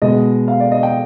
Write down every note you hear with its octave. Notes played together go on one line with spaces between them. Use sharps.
B2 G#3 D#5
F5
D5
D#5
G5